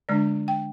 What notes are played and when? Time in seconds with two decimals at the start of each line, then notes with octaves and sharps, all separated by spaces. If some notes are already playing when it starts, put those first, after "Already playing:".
0.09 D3 G#3 D4 D5
0.48 G5